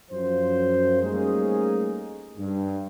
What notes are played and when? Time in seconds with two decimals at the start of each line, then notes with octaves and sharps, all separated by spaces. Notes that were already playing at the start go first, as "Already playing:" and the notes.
0.11 F#2 F3 C5
1.02 G3 A3 A#3 C#4 D#4 G#4
2.38 G2